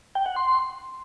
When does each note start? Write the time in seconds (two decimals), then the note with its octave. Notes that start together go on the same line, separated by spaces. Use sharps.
0.15 G5
0.26 F#5
0.36 C6